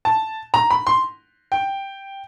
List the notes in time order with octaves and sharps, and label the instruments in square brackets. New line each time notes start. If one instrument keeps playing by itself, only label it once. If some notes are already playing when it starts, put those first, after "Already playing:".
[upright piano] A5
A#5
B5
C6
G5